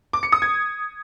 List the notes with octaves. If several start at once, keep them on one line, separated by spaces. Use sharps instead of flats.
D6
C#7
D#6
G#6